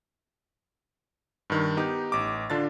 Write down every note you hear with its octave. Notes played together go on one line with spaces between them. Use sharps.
G2 D#3
B3 D#4 G4
A1 D6
D3 D4 F4 A6